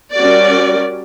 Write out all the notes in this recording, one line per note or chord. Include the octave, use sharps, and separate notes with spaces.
G3 C#4 F#4 A#4 D5